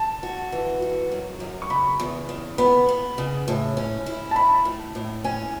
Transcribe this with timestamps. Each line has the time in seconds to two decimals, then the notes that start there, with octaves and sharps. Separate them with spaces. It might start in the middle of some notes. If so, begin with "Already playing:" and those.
Already playing: A5
0.23 F#4
0.52 E3
0.82 F#4
1.12 F#2
1.40 F#2
1.62 C#6
1.70 C#3 B5
2.00 E2
2.29 C#3
2.58 B3 B5
2.89 B3
3.18 C#3
3.48 A2
3.77 C#4
4.06 E4
4.31 A5
4.36 E4 B5
4.65 A2
4.95 A2
5.24 C#4 G#5